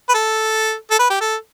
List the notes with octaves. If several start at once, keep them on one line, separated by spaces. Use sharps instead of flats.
B4
A4
A4
B4
G4
A4